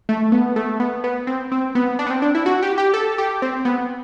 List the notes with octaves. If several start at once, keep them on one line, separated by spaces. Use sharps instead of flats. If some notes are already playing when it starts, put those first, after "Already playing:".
A3
B3
A3
B3
B3
C4
C4
B3
D4
B3
C4
D4
E4
F#4
G4
G4
A4
G4
C4
B3